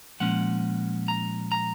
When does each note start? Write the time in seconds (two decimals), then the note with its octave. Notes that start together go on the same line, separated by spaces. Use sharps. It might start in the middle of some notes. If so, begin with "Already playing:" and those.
0.20 A#2 F3 G#3 C#4 F#5
1.08 A#5
1.52 A#5